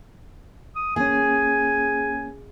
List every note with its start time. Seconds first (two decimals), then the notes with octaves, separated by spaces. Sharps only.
0.76 D#6
0.96 A#3 C#4 G#4 G#5